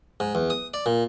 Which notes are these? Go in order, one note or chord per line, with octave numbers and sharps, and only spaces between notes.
G#2
E2
D#6
D5
A#2